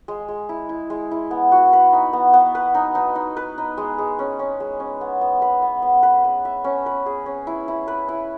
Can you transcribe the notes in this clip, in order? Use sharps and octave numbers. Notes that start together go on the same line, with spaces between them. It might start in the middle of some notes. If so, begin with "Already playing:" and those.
G#3
G#3
E4
E4
G#3
E4
B3
F#4
B4
D#4
B3
B3
B4
D#4
D#4
D#4
B4
D#4
G#3
G#3
C#4
C#4
G#3
C#4
B3
B3
B4
B3
B3
B4
B4
E5
C#4
B4
G#4
C#4
E4
E4
B4
E4